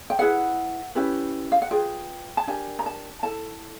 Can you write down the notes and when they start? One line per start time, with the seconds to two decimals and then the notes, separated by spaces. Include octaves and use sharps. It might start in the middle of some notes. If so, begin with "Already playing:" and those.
0.10 G5
0.19 E4 G#4 B4 F#5
0.95 C#4 E4 G4 B4
1.52 F5
1.62 F#5
1.71 F4 G#4 B4 G5
2.37 A5
2.47 D4 G4 A#4 G#5
2.79 A#5
2.86 A5
3.23 E4 A4 A5